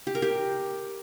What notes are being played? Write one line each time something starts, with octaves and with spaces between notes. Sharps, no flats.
G4
A#4
G4